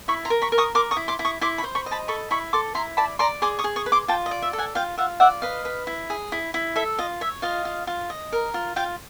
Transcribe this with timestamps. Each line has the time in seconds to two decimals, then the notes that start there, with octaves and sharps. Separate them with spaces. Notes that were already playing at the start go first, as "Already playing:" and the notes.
0.08 E4 B5 C#6
0.25 A#5 C6
0.30 A#4
0.42 B5 C#6
0.52 A#4
0.58 C#6 D#6
0.75 A#4 C6 D6
0.91 C#6 D#6
0.97 E4
1.08 C6 D6
1.19 E4
1.25 C#6 D#6
1.41 E4 C6 D6
1.58 B5 C#6
1.64 C5
1.75 B5 C#6
1.86 D#5
1.91 A5 B5
2.08 A4 B5 C#6
2.31 E4 B5 C#6
2.53 A4 C6 D6
2.75 E4 A#5 C6
2.97 D5 A5 B5
3.19 D5 A#5 C6
3.42 G#4 C6 D6
3.59 C#6 D#6
3.64 G#4
3.76 C#6 D#6
3.86 B4
3.92 C6 D6
4.08 F4 G5 A5
4.26 D#5
4.31 D5
4.42 E5
4.53 A4
4.58 F#5 G#5
4.75 F4 F5 G5
4.98 F4 E5 F#5
5.20 D5 E5 F#5
5.42 B4 D#5 F5
5.65 B4
5.87 E4
6.10 G#4
6.32 E4
6.54 E4
6.76 A4 E5
6.98 F4 D#5
7.21 C#5 E5
7.42 F4 D#5 F5
7.65 F4
7.87 F4
8.10 D#5
8.32 A#4
8.54 F4
8.76 F4 F5 G5